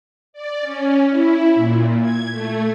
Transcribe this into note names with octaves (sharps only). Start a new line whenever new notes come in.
D5
C#4
E4
A#2
G#6
A3